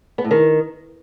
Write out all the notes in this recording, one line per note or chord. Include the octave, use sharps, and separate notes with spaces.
B3
A2
D#3